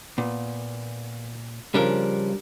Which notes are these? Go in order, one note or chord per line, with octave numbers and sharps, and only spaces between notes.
A#2 B3
C#3 F3 G3 D4 A#4